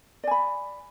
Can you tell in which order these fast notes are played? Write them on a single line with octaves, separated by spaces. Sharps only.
D5 G#5 B5